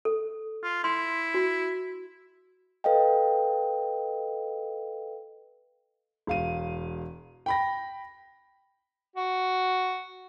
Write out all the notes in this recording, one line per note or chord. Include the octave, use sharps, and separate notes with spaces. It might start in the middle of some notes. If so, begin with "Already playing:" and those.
A4
F4
E4 C6
F#4
A4 B4 D#5 F5 G5
E1 F5 D#7
G5 B5 A#6
F#4